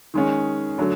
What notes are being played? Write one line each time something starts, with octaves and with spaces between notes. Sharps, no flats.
D#3 G#3 C#4
D3 F#3 A3